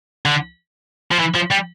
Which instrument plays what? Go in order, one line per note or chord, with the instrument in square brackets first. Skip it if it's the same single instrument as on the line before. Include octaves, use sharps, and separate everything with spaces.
[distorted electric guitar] D3
F3
E3
F3
G3